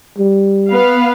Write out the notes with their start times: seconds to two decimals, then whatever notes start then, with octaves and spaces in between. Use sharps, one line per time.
0.18 G3
0.69 B3 B4 F5